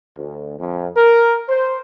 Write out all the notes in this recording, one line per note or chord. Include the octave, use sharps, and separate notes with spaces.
D2
F2
A#4
C5